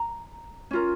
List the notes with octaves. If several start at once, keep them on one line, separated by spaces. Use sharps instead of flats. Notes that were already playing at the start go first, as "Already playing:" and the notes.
Already playing: A#5
C#4 F4 A#4